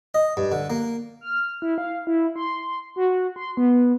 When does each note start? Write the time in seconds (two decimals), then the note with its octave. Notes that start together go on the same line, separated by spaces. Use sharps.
0.14 D#5
0.37 G2
0.52 D3
0.70 A#3
1.21 F6
1.62 E4
1.78 F5
2.07 E4
2.36 C6
2.96 F#4
3.36 C6
3.57 B3